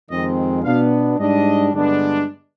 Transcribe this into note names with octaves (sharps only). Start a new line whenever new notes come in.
F2 D#3 G#3 C4 D#5
B2 B3 D4 F5
G#2 G3 D4 D#5
G2 D3 G#3 B3 D4